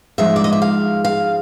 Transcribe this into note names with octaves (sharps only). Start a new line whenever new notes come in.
G#2 F3 G#3 E5
D5
D#5
E5
F5
F5